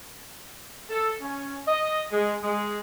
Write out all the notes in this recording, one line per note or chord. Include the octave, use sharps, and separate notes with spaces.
A4
C#4
D#5
G#3
G#3